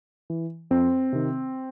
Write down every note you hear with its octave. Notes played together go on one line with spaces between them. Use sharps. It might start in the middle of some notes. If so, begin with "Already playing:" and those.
E3
F2 C4
C3 D#3